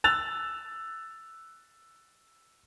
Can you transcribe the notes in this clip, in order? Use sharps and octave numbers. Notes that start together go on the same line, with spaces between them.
E6 F#6 A6 F7